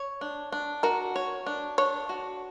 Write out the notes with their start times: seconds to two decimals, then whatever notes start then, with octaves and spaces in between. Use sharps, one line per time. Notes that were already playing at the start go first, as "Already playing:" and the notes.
Already playing: C#5
0.21 D4
0.52 D4
0.83 F#4 A#4
1.16 C#5
1.46 D4
1.78 D4 C#5
2.09 F#4